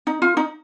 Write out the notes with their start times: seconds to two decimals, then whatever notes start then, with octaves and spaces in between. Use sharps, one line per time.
0.07 D#4
0.22 F4
0.37 D#4